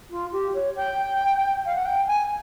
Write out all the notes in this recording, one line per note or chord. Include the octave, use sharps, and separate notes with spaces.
F4
G4
C#5
G5
F5
F#5
G5
G#5